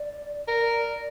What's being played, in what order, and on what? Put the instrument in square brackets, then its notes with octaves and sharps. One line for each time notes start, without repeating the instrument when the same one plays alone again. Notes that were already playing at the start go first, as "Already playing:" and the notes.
Already playing: [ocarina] D5
[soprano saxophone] A#4 [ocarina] D5